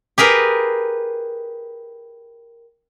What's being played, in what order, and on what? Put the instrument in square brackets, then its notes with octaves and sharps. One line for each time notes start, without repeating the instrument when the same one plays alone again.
[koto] G4 G#4 A#4 B4